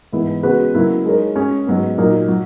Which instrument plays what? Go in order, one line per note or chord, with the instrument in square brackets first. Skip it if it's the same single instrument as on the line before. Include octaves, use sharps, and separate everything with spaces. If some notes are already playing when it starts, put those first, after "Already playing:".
[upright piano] G#2 E3 B3 E4
C#3 G#3 B3 F#4 B4
C#3 F#3 A#3 E4
G#3 D#4 A#4 C#5
G#3 C#4 G#4 C#5
G#2 F#3 B3
A#2 F#3 A#3 D#4
F#3